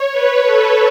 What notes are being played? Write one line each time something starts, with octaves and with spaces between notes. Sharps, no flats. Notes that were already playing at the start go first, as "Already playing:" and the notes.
Already playing: C#5
B4
A4